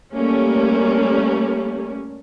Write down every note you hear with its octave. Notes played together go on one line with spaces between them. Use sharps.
G3 A3 A#3 C#4